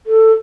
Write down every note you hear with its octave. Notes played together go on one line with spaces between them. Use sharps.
A4